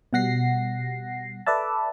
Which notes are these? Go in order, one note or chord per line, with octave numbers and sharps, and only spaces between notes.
B2 G3 F#5 A#6 C7
A4 B4 D5 E5 A5